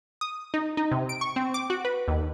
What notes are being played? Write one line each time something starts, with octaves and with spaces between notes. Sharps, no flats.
D#6
D#4
D#4
C3
D7
C#6
C4
D6
F#4
B4
D#2